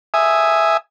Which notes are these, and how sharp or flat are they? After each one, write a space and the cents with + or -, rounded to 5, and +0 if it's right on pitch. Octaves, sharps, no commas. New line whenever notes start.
E5 +0 G#5 +0 D#6 +0